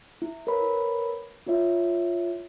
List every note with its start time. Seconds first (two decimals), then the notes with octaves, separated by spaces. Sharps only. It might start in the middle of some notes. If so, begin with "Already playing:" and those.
0.22 E4
0.47 A#4 B4 C#5 B5
1.46 E4 F4 C#5 E5